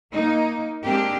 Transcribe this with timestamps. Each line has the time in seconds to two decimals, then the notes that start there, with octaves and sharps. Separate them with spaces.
0.11 A#3 D#4
0.85 G#3 A#3 C4 D4 G4 A#4